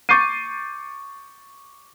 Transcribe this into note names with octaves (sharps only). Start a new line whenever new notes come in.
C#6 D6 G6 A6 C7 D#7